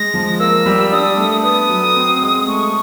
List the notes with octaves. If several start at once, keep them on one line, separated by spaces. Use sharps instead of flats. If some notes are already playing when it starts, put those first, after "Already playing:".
Already playing: G#3 A#6
F3
A#3 E6
G3
D4 D#6
A3
B3 D#6
F#3
C4
G#3
A3 C#6